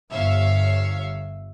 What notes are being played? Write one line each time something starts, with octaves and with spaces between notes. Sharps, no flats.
G1 C#5 E5 F5